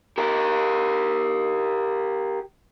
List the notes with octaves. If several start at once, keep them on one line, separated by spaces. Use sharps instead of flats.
G4 A#4